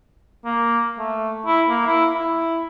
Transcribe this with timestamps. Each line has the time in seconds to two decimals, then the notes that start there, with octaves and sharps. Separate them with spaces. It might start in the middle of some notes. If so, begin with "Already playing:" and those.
0.45 A#3
0.99 A3
1.46 E4
1.69 A#3
1.87 E4
2.15 E4